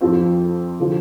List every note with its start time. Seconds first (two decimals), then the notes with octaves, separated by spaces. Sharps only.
0.01 F2 F3 C4 F4 C5
0.80 D3 F3 D4